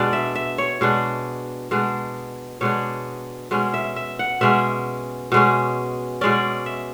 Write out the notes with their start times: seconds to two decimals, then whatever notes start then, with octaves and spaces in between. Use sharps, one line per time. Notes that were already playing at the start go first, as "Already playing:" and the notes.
Already playing: B2 G#3 D4 D5
0.13 E5
0.35 E5
0.58 C#5
0.81 B2 G#3 D4
1.71 B2 G#3 D4
2.61 B2 G#3 D4 C#5
3.51 B2 G#3 C#4
3.74 E5
3.96 E5
4.19 F#5
4.41 B2 G#3 C#4 E5
5.32 B2 G#3 C#4
6.21 B2 G#3 C#4 D5
6.66 E5